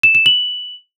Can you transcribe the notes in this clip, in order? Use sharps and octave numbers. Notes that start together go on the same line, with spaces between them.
E7
E7
F#7